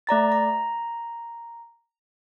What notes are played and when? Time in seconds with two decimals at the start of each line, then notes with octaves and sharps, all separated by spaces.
0.07 A3 D5 A#5 A6
0.32 A#5